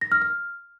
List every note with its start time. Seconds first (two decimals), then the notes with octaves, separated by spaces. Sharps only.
0.01 A#6
0.12 F6
0.22 F6